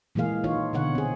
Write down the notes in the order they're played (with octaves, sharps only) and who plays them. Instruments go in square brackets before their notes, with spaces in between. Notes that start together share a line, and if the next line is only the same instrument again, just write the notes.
[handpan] A#2 E3 G#3 A#3 G#4 F5
D#3 D#4 F4 C#5
B2 D3 C#5 F#5
C4 G#4